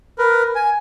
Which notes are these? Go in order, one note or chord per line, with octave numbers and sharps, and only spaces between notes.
A#4 B4
G#5